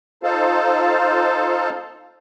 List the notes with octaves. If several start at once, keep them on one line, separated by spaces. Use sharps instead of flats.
D#4 F4 A4 C5 F5 A5